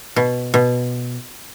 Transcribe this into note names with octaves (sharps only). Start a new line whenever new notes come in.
B2
B2